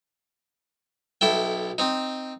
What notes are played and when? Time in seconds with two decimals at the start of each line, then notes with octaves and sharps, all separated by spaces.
1.21 B1 E4 A4 G5
1.78 C4 D#4